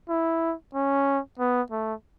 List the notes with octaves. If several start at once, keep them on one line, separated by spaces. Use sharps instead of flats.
E4
C#4
B3
A3